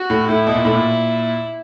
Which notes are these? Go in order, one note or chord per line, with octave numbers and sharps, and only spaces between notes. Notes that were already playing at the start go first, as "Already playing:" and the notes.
Already playing: F#4
A2
A2 E4
B2
A#2
A2
A#2